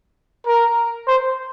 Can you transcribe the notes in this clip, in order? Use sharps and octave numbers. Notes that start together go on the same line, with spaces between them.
A#4
C5